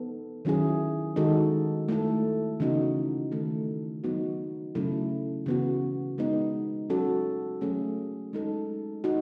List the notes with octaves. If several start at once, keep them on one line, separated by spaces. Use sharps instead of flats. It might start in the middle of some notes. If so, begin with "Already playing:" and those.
Already playing: E3 B3 D#4 A4
D#3 F#3 C#4 E4 G#4
D#3 G#3 D#4 F#4 A4
A3 E4 A4
C#3 E3 B3 D#4 F#4
D#3 A3 E4 A4
F#3 B3 D#4 F#4
C#3 F#3 A3 E4 A4
C#3 E3 B3 F#4
G#3 B3 D#4
F#3 C#4 F#4 A4
F#3 A3 C#4 G#4
G#3 D#4 A4
D#4 F#4